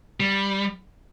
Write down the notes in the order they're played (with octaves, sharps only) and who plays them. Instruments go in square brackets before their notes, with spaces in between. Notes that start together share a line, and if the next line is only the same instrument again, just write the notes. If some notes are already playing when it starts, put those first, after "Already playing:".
[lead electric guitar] G3